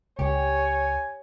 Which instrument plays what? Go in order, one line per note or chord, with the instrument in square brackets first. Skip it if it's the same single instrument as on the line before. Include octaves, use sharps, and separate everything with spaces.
[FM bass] C#2 [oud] G4 [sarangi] C#5 [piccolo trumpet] G#5